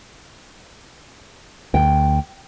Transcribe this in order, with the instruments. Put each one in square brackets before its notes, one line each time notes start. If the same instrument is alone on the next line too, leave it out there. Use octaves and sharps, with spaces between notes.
[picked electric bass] D2 [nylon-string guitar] G5